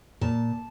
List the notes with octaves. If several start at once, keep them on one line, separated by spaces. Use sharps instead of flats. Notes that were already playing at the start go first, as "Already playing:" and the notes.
A#2 A5